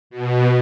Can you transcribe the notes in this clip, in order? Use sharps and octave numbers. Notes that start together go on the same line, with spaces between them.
B2